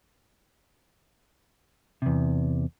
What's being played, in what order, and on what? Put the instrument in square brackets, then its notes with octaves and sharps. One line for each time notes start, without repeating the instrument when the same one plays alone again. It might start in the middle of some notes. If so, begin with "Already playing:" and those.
[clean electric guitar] E2 C3